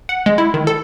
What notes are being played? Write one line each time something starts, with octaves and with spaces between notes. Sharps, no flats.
F#5
G#3
E4
D#3
A4